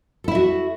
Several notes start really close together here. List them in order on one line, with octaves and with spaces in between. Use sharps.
A4 E4 E5 F#4